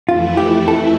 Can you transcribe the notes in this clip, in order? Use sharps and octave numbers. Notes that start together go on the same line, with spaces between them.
F2 E3 A3 E4 F4
G4
A4